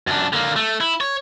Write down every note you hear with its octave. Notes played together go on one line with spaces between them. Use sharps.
F#2 D4
D3 A#3
A3
E4
C#5